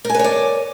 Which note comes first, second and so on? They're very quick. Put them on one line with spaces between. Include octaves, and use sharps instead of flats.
A#4 G#5 B4 C#5 D5